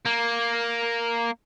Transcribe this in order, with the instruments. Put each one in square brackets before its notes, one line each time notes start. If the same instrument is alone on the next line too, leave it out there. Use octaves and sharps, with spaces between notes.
[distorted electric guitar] A#3